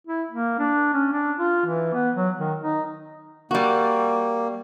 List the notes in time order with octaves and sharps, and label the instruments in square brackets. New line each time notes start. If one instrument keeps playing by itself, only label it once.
[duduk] E4
A#3
D4
C#4
D4
F4
E3
B3
F#3
D#3
D#4
[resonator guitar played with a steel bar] G3 F#4 [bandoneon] A#3